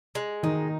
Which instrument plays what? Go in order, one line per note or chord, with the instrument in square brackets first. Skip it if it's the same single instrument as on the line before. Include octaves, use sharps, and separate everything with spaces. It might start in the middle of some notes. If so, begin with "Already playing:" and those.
[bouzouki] G#3
[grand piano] D#3 [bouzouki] D#4